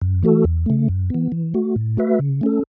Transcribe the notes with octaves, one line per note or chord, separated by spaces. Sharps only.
F#2
E3 A3 F#4 A4
E2
C#3 A3
F#2
E3 B3
E3
A3 F#4
A2
A3 F#4 B4 E5
C#3
A3 C#4 A4